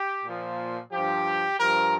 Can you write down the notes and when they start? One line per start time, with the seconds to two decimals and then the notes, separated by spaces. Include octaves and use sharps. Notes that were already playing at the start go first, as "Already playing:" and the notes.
Already playing: G4
0.24 A#2 F3
0.92 G2 F3 G4
1.60 G2 F3 A#4